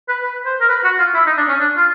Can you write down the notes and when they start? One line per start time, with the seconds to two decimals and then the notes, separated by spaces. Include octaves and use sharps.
0.09 B4
0.23 B4
0.46 C5
0.61 A#4
0.69 B4
0.84 F#4
0.99 F4
1.14 E4
1.26 D#4
1.37 D4
1.49 C#4
1.60 D4
1.77 F4